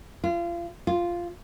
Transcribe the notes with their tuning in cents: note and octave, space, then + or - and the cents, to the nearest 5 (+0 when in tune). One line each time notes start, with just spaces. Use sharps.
F4 -30
F4 -5